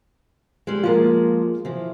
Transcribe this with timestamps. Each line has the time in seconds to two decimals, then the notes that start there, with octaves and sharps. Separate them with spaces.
0.67 G3 G#3
0.84 F3 G#3 A#3 F4
1.65 E3 F3